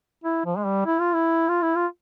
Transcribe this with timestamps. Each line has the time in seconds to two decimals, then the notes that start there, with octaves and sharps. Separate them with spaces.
0.24 E4
0.46 F3
0.57 G#3
0.65 G3
0.86 E4
1.00 F4
1.14 E4
1.49 F4
1.62 E4
1.76 F4